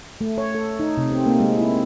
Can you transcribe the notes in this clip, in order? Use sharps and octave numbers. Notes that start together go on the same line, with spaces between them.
A3
C#5
A4
D#4
C3
C4
A#3
G#3
E4